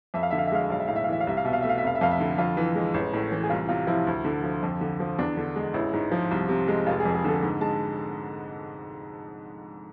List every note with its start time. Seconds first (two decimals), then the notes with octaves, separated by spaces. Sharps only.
0.14 F2 E5
0.23 F5
0.31 D3 E5
0.38 F5
0.47 E5
0.52 G#3 F5
0.64 E5
0.70 B1 F5
0.80 E5
0.88 A2 F5
0.96 E5
1.04 F5
1.08 E3 E5
1.20 F5
1.27 C2 E5
1.37 F5
1.45 B2 E5
1.53 F5
1.62 A3 E5
1.69 F5
1.78 E5
1.82 F1 F5
1.95 E5
2.01 F2 F5
2.11 E5
2.20 D3
2.38 F2 F4
2.57 E3
2.75 G#3
2.94 A1
3.14 A2
3.32 E3
3.43 G#4
3.50 C2 F4
3.69 C3 F4
3.87 F3 E4
4.07 D2
4.25 D3
4.43 F3
4.63 F2
4.81 D3
5.00 F3
5.19 E2 D4
5.37 D3
5.56 G#3
5.74 A1 E4
5.93 G#2
6.11 F3
6.31 C2
6.49 C3
6.68 G#3
6.86 F1 F4
7.00 G#4
7.05 F2
7.14 G#4
7.24 D3 A4
7.42 G#2
7.61 G#3 A5